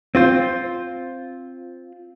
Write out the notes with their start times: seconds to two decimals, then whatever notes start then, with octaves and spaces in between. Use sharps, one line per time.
0.15 C4 F4 C5